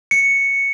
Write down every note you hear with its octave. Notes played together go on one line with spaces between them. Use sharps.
C#7